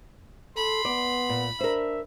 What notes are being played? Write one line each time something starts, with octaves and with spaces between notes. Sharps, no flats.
A4 B5 C6
B3 D5
A#2
D4 A#4 C5 E5